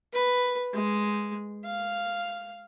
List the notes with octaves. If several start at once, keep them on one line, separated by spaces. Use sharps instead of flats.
B4
G#3
F5